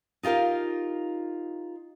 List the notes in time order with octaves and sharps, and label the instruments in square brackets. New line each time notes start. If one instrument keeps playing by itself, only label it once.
[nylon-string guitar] D#4 F4 G4 A#4 F5